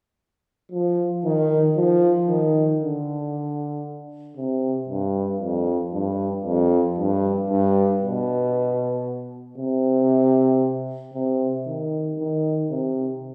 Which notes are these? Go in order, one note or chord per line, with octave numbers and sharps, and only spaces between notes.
F3
D#3
F3
D#3
D3
C3
G2
F2
G2
F2
G2
G2
B2
C3
C3
D#3
D#3
C3